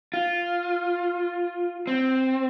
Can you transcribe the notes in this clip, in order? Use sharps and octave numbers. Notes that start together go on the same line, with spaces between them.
F4
C4